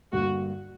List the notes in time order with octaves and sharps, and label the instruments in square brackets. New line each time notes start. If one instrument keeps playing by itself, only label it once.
[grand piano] G2 D3 A#3 [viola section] F#4